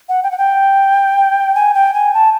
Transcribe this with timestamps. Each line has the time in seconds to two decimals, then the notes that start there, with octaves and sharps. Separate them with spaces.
0.09 F#5
0.23 G5
0.31 F#5
0.38 G5
1.55 G#5
1.74 G5
1.94 G#5
2.14 A5